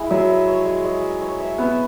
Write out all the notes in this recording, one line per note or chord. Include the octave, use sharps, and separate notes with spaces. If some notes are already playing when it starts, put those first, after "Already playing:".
Already playing: G#3 E4
F#3 E5
E5
C#5
G#3
G#3
E5
C#5
E5
B3 E5